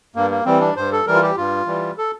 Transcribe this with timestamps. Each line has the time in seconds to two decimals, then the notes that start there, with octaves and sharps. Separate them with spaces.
0.16 G2 A#3
0.30 A#3
0.45 E3 G3 C4
0.60 D4
0.76 G2 C5
0.92 A4
1.07 E3 G3 A#4
1.14 F4
1.22 G4
1.37 G2 F4
1.67 E3 G3
1.98 A4